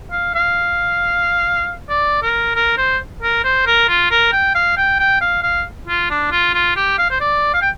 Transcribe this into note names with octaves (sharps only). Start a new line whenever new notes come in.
F5
F5
D5
A#4
A#4
C5
A#4
C5
A#4
F4
A#4
G5
F5
G5
G5
F5
F5
F4
D4
F4
F4
G4
F5
C5
D5
F5
G5